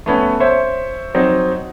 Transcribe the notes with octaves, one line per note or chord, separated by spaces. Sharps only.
A3 B3 C#4
C5 C#5 E5
F#3 C4 D#4